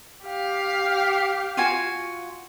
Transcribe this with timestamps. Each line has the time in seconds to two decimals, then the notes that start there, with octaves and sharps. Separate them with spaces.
0.24 G4 F5
1.57 F4 F#4 G#5